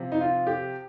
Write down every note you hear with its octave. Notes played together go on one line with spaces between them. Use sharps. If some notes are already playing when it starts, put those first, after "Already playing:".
Already playing: C3 F3
D#4
F4
G4